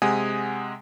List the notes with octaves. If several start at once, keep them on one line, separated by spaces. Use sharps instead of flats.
C3 G#3 F#5 G#5 D#6